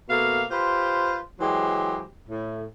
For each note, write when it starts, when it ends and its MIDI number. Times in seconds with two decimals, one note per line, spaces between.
0.09 0.43 47
0.09 0.43 57
0.09 0.43 58
0.09 0.43 77
0.51 1.17 65
0.51 1.17 67
0.51 1.17 71
0.51 1.17 72
1.40 2.02 52
1.40 2.02 54
1.40 2.02 56
1.40 2.02 67
1.40 2.02 72
2.29 2.63 45